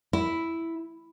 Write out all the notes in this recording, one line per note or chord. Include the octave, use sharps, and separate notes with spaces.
E4